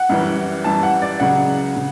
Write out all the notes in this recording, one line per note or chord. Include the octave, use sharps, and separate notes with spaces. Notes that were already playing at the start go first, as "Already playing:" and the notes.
Already playing: F#5
F#2 E3 G3
F#2 E3 G3 A5
F#5
D5
C#2 C#3 F#3 F#5
C#3